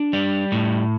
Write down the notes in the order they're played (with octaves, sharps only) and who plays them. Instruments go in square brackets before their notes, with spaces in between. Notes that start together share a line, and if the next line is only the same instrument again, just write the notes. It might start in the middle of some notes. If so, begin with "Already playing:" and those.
Already playing: [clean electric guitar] D4
G3
A2